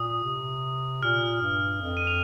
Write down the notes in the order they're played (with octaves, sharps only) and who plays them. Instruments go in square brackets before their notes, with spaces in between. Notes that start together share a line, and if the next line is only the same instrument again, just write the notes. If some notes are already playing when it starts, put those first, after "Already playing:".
Already playing: [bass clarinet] A#2 [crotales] D#6
[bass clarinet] C3
[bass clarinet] A#2 [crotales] F6
[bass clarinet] G2
F2
[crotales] D#7
F7